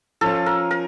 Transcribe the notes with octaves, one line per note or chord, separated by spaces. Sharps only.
F3 C#4 F4 A4
A#4
A#4